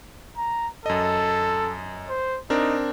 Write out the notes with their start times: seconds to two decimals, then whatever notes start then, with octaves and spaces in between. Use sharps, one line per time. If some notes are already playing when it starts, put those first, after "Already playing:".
0.37 A#5
0.86 F#2 A4 D#5
2.10 C5
2.50 C4 D4 D#4 A#4